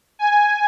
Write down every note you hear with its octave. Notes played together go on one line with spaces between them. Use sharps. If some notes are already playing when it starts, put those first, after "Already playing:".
G#5